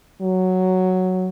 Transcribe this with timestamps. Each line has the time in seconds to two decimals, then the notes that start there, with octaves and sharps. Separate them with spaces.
0.21 F#3